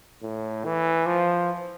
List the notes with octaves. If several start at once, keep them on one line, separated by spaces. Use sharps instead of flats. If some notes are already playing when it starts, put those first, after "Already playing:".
A2
E3
F3